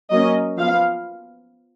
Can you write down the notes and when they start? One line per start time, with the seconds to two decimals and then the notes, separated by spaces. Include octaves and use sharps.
0.12 F#3 A#3 C#4 D#5
0.58 F3 B3 F5